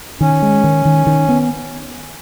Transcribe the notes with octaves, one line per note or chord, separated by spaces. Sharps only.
D#3 C#4
G#3
D#3
D#3
D#3
B3